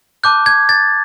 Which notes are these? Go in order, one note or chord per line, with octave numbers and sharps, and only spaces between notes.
A5 D6 F#6 G6
G#6
A6